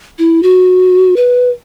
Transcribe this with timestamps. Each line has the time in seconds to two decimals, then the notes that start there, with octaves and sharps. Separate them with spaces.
0.19 E4
0.43 F#4
1.16 B4